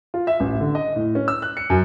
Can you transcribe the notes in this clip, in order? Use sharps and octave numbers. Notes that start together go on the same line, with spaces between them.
F4
E5
A1
D3
D#5
A2
C#4
E6
F#6
C#7
F#2